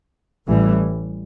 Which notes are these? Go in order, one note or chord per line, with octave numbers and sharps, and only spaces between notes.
A1 A2 E3 G3